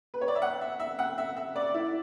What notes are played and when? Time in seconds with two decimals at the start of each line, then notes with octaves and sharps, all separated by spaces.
0.14 B4
0.21 C#5
0.28 D5
0.35 E5
0.42 F#5
0.61 E5
0.80 E5
0.99 F#5
1.18 E5
1.37 E5
1.56 D5
1.74 E4